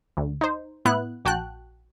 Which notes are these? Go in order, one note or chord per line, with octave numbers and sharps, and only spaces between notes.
D2
D#4 C5
A2 B3 E4 F#6
A#1 F#4 G5 A5 F#6